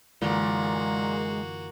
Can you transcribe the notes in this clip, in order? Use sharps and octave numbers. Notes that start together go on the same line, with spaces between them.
F#2 A#2 D3 E3 G#3 A#3 F#4